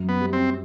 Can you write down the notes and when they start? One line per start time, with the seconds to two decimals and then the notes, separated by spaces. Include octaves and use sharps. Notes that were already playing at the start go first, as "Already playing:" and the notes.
Already playing: F#2
0.09 B3
0.21 G3
0.33 C4